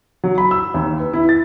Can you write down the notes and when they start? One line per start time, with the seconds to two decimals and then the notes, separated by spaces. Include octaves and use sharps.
0.24 F#3
0.38 B5
0.51 E6
0.74 D#2
0.99 B4
1.13 E4
1.29 A6